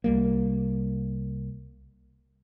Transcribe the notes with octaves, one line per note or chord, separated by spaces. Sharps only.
C2 G3 A#3